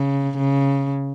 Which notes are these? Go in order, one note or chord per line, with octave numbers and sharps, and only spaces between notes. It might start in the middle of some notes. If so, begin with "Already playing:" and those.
Already playing: C#3
C#3